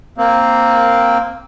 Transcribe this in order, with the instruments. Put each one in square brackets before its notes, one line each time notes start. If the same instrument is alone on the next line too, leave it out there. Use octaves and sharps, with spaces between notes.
[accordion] A#3 C4